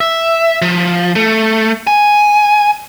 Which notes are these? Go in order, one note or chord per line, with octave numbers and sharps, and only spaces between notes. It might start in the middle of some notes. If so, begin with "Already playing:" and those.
E5
F3
A3
G#5